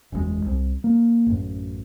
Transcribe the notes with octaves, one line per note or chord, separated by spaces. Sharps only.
F#1 E2 A#2 G#3
C2
A#3
A1 F#2